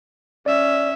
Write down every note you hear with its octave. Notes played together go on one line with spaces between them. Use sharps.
C#4 D5 E5